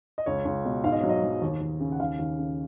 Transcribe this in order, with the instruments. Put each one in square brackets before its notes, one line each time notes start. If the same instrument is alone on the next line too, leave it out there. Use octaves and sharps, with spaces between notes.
[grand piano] D#5
C#2 C#5
C#2
B2
G#2 F5
D#5
F#3 C#5
D#5
F#3
D#2
D#2
C#3
F#5
D#2 F5
D#2
C#3